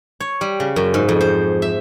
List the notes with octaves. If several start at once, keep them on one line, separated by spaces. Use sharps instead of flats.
C#5
G3
C#3
F#2
G#2
F2
C5
E5